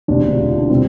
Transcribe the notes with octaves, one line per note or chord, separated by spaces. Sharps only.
E1 D2 C3 D4
F4
E4
D4
C3 E3 G3 C4